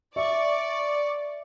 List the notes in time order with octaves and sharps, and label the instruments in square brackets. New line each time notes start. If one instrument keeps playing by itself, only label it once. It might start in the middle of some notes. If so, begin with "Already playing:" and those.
[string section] D5 [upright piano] E5 [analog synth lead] C#6